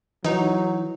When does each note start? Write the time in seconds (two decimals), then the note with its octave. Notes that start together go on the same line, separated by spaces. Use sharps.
0.25 E3 F#3 D#4